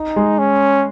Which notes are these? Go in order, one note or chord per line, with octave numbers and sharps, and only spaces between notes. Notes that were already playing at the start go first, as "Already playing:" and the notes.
Already playing: D#4
G#3
C#4